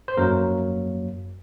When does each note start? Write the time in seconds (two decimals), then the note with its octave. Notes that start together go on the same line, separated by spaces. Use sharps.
0.08 C5
0.17 F#2 F#3 A#3 A#4